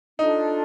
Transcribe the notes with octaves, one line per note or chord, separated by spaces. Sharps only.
D4 D#4 F4 A4